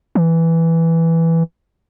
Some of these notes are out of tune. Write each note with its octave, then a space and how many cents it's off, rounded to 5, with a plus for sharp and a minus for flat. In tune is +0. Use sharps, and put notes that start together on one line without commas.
E3 +0